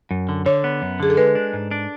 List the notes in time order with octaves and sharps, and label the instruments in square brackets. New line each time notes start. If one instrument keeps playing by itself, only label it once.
[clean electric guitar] F#2
D3
[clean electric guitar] D3 [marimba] C#5
[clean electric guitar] B3
F#2
[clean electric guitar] D3 [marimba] G#4
[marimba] A4
[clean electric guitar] G#3 [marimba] B4
[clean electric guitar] D4
G#2
D4